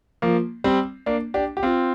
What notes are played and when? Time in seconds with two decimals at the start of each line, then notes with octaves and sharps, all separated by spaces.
0.22 F3 A#3
0.64 G3 C4
1.06 A#3 D4
1.34 D4 G4
1.57 G4
1.63 C4 F4